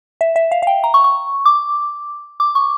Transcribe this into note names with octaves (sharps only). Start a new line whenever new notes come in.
E5
E5
F5
F5
G5
A#5
C#6
C#6
D6
D6
C#6